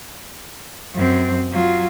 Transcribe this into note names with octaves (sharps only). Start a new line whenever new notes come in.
F#2 C4
F#3 F4